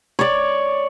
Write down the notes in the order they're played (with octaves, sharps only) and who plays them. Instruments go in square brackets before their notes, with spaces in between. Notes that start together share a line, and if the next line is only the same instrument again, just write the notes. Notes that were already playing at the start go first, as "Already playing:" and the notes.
[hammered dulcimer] C#5 D5